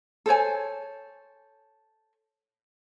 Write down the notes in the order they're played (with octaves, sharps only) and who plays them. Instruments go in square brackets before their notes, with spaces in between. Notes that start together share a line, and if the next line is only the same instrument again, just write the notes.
[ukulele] A4 C5 C#5 G#5